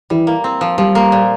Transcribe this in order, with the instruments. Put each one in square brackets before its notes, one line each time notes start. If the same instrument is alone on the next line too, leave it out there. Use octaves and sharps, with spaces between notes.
[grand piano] E3 [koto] G3
[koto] A#3
C4
F3
[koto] F3 [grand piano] G3
[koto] A#3
A#2